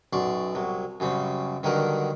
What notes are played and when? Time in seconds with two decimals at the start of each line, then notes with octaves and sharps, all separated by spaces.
0.13 B1 F#2 D5 C6 C#6
0.55 C2 F#3
1.00 F#2 C#3 G3 C4
1.63 G2 D3 D#3 F#3 A#4 F#5